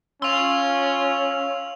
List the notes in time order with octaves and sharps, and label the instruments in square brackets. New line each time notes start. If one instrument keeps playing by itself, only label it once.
[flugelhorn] C#4 [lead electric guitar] F5 C6 [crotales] E6 F7